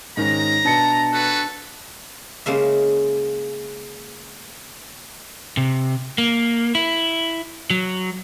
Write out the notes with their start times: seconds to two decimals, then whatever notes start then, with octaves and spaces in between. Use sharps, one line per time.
0.17 G#2 D#3 C#4 A#5
0.65 B2 D4 A5 A6 C#7
1.12 F#4 A4 B4
2.46 C#3 G#3 A#3 E5
5.57 C3
6.18 A#3
6.75 E4
7.70 F#3